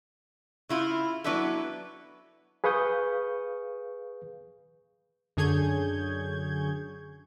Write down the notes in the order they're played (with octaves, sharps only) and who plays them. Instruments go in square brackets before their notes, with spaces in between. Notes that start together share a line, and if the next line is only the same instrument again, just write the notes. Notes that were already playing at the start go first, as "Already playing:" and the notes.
[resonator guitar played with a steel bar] C#3 E4 F4
F#3 B3 D4 E4 A4
[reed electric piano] G#4 B4 F5 C#6 D#6 G6
[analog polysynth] F#2 D3 G#4 C#5 G6 G#6